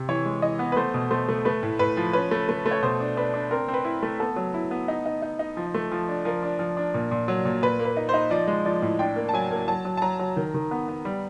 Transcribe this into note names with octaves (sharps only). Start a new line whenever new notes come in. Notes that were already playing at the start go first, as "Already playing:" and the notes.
Already playing: C3
E3 C#5
G#3
E3 D#5
B3
B4
A3 C5
B2
A3 C5
A3
A3 B4
A2
A2 B4
F3
C#4 B4
A3
A3
A3
C#5
B2 C5
D4
D4 B4
D4
C4 A#4
C4
B4
E4
A3
B3 A4
F#3
E4
B3
D#4
D#4
D#4
D#4
F3
A3
F3
D4
F3 A#4
D4
F3
D4
A#2
A#2
F#3
A#2
A#2 B4
A#3
B4
D#4
C5
D#4
F3 D5
G#3
F3 D5
A2
D4 G5
A#3
A5
F#3 G#5
A#3
F#3 A5
F#3
A5
F#3 A#5
F#3
D#3
D#3
B3
B3
G3